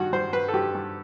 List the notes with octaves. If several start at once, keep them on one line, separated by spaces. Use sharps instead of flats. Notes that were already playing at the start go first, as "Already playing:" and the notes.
Already playing: G2 D#3 F#4
G2 C5
G2 B4
A4
G2 G4
G2